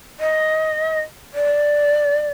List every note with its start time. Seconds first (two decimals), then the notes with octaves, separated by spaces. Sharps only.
0.19 D#5
1.34 D5